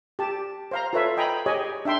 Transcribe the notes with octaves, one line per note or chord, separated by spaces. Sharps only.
G4 A5
C5 F5 A#5
F4 A4 B4 C#5 E5
D#5 G5 G#5 A#5 B5
G4 G#4 C#5 D#5 G#5
D4 E5 G5 C6